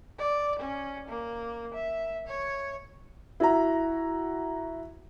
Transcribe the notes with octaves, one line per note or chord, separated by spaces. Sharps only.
D5
C#4
A#3
E5
C#5
E4 F#4 A#5